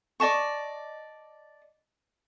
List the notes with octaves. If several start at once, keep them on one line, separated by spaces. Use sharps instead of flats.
D5 D#5 A5 C#6